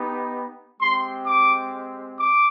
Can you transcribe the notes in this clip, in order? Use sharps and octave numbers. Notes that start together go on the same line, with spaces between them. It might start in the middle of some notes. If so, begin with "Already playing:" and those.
Already playing: B3 D#4 G4
G#3 C4 G4 C6
D6
D6